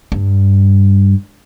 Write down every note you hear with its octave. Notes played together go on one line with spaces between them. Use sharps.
G2